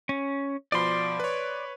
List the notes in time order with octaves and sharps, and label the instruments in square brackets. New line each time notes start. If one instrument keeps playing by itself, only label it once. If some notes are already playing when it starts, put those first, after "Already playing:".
[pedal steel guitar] C#4
[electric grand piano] B2 F3 B5 [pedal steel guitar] D5 C6
[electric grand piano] B4 C#5